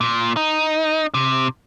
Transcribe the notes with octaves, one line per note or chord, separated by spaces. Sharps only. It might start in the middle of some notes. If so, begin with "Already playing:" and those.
A#2
D#4
C3